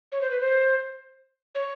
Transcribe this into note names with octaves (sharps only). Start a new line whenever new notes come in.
C#5
C5
B4
C5
C#5